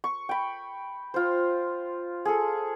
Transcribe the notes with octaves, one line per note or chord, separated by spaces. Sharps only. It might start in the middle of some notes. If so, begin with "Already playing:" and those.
C#6
G5 B5
F4 C5
G#4 A4